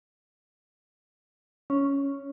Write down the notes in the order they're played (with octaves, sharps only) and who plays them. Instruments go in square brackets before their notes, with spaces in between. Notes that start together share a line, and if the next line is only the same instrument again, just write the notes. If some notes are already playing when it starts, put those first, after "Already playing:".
[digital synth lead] C#4